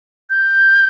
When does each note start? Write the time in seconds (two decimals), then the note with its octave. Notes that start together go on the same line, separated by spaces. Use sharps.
0.30 G6